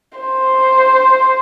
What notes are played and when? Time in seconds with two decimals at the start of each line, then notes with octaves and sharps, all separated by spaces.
0.18 C5